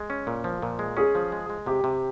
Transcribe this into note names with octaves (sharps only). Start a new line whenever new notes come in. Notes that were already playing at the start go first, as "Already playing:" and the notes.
Already playing: G#3
C#4
A#2
F3
A#2
G#3
C#4 G#4
F3
G#3
G#3
C3 G4
C3